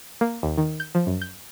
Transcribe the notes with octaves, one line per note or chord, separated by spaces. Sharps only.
A#3
D#2
D#3
G6
F3
F#2
G6